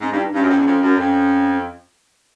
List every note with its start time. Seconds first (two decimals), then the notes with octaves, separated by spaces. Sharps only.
0.01 G#2 C4
0.10 D4
0.12 G2
0.18 E4
0.26 D#4
0.34 G2 C#4
0.42 F#2
0.49 F2
0.58 E2
0.66 F2
0.82 F#2
0.98 F2 C#4